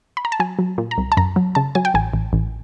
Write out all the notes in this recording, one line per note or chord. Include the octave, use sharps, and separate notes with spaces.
B5
A#5
A5
F#3 G#5
F#3
A#2
A#5
C2
A5
F#2 A#5
F#3
C#3 A5
F#3 G#5
G5
A1 G#5
A1
A1